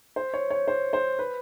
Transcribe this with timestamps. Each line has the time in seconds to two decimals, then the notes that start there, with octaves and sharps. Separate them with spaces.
0.16 C5
0.34 C#5
0.50 C#5
0.68 C5
0.93 C5
1.19 B4